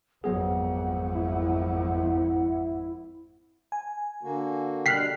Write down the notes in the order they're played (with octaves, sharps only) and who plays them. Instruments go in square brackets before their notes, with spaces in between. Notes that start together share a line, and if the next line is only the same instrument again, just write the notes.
[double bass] G#1 F2 [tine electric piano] F#3 B3 G#4 [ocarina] F#5
[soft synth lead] E4
[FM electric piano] G#5
[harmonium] D3 A#3 F#4
[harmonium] B2 D3 G3 [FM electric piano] G5 F6 F#6 [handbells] B6 C7